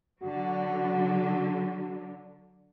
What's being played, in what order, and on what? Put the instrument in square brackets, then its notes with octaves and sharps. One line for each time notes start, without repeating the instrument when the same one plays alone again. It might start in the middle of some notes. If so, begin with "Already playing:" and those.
[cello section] D3 F#3 [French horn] F#4